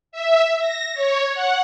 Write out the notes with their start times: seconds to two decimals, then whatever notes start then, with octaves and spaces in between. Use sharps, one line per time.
0.12 E5
0.59 A#6
0.94 C#5
1.33 F#5